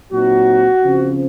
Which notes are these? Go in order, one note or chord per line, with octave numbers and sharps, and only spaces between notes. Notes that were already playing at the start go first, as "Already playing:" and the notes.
A#2 F#3 C4 D#4 F#4
C#3 F3 C4